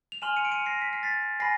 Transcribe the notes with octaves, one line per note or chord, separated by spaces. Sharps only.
F7
G#5 C6 F6 E7 F#7
C#7 D#7
D7
C#7 D#7
A#6 C7
B6
C7
A6 B6
G#5 B5 A#6 C7